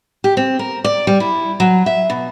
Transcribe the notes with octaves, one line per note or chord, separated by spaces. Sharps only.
G4
C4
A#4
D5
G3
E4
F#3
E5
B2